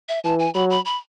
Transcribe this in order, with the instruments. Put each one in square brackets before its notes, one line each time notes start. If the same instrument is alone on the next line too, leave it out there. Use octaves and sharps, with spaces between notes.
[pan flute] E5
[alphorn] E3 [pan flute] A5
[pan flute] G#5
[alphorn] F#3 [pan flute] B5
[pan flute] B5
B5